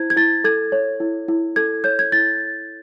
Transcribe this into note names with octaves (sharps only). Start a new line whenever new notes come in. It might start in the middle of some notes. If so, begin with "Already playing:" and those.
Already playing: E4 C5 G#6
G#6
E4 A6
A4 G#6
C#5
E4
E4
A4 G#6
C#5 G6
G#6
E4 A6